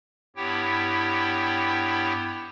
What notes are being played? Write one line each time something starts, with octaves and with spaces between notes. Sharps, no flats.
G2 B3 E4 G4 C#5 G5